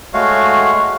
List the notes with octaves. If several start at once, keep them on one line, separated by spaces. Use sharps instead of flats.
G#3 A3 F#4 C#5 F5